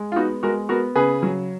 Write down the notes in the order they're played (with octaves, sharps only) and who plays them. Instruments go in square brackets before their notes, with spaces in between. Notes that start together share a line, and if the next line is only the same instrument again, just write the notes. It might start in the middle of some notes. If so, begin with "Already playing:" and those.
Already playing: [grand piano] G#3
F4
B3 D#4 F#4
G#3 F#4 A#4
B3 F#4 A#4
C#3 G#4 B4
F#3